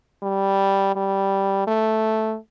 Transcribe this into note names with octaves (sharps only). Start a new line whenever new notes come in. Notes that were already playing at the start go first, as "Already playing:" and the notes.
G3
G3
A3